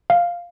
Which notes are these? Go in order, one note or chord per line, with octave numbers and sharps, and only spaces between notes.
F5